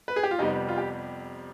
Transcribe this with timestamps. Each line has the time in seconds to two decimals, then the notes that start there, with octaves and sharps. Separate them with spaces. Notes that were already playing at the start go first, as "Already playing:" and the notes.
0.08 B4
0.16 G#4
0.23 G4
0.31 F4
0.39 F2 C3 G3 B3 D#4
0.69 F4
0.78 G4